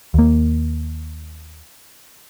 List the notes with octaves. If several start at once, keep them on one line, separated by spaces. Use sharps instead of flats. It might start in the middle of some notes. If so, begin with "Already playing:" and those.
D#2 A#3